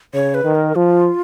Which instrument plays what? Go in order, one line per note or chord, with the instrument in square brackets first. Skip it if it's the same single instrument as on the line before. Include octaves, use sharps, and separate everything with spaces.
[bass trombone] C#3 [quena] C#5
[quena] B4
[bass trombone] D#3
[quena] A#4
[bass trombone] F3 [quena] F4